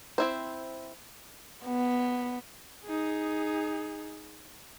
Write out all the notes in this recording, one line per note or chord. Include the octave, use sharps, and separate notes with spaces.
C4 E4 C5
B3
D#4 G#4